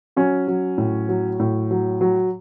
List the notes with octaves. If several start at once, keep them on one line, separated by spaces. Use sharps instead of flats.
F#3 C#4
F#3
A2
F#3
A2
F#3
F#3